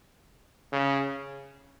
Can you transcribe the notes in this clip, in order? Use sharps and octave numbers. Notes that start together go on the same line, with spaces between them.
C#3